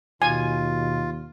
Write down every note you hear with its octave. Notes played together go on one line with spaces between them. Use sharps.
D#2 B2 F4 G#5